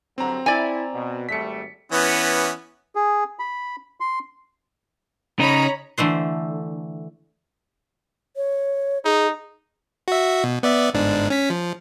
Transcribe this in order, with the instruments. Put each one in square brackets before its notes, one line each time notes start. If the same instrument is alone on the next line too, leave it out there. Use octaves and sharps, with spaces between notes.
[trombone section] G2 D3 F#3 [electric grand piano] C4 A#5
[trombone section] E4 [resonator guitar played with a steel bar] D5 G#5
[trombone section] B2
[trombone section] G#1 G3 A3 [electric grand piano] B6 C#7
[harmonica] E3 B3 C#4
[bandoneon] G#4
B5
C6
[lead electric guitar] C#3 D#4 [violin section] C#5 A#5 B5
[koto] D3 E3 A3 C5
[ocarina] C#5
[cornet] D#4 [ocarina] G#4
[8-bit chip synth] F#4 E5
B2
B3 D5 E5
G1 G#2 D4
C#4 B6
F3